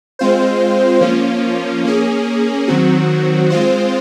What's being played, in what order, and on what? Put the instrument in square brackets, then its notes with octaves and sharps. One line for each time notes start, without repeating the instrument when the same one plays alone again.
[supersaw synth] G#3 C4 F4 C5
F3 A#3 C#4 F4
A#3 C#4 G#4
D#3 F#3 C4 F#4
G#3 C4 F4 C5